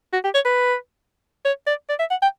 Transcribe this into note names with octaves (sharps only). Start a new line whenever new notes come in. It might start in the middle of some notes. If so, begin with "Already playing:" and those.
F#4
G4
C#5
B4
C#5
D5
D5
E5
F#5
G5